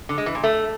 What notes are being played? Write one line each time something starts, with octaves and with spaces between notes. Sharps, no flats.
D3
G#3
E3
A#2
A3